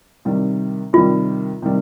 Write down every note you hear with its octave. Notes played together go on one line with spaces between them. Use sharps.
C3 D#3 G3
C3 D#3 G3 F4
C3 D#3 G3